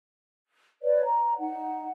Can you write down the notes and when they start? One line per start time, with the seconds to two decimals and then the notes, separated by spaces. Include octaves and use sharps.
0.82 B4 C#5 D5
1.04 A#5
1.38 D#4 F#5